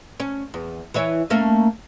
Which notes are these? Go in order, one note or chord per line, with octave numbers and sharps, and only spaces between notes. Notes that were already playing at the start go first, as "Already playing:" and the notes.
C#4
E2
E3 E4 C#5
A3 A#3 C#4